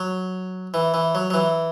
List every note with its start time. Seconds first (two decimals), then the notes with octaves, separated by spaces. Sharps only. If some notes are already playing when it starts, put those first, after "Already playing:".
Already playing: F#3
0.74 E3
0.94 E3
1.15 F#3
1.30 F#3
1.34 E3